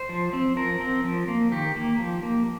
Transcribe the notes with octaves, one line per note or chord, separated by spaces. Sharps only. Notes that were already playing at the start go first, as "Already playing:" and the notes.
Already playing: C5
F3
C4
F3 A#4
C4
F3
A#3
D#3 G4
A#3
F3
A#3